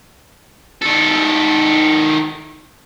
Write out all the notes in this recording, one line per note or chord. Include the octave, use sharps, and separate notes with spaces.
D#3 A4